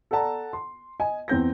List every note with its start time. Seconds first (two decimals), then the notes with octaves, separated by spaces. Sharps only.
0.11 A4 D5 F#5 A5 A#5
0.53 C6
1.00 D#5 G#5
1.28 E2 C4 G6 A#6